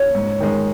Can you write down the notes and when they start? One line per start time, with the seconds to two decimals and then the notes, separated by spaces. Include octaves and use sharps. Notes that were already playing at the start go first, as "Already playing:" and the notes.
Already playing: C#5
0.15 G#2
0.40 D#3 G#3 D#4